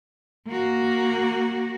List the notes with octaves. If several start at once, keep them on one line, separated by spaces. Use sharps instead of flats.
A#3 F#4